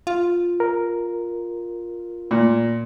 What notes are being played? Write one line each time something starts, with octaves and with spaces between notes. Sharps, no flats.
F4
A#4
A#2